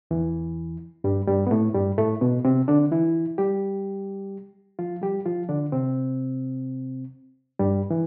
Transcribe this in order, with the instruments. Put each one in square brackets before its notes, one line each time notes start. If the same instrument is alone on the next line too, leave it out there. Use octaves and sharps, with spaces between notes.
[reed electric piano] E2 E3
G2 G3
G2 G3
B3
A2 A3
G2 G3
A2 A3
B2 B3
C3 C4
D3 D4
E3 E4
G3 G4
F3 F4
G3 G4
F3 F4
D3 D4
C3 C4
G2 G3
E3